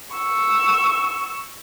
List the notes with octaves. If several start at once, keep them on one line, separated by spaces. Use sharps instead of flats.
C#6 E6